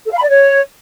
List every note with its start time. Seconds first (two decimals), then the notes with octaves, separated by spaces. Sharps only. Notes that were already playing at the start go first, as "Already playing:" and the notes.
0.06 A4
0.12 F5
0.18 B5
0.23 D5
0.29 C#5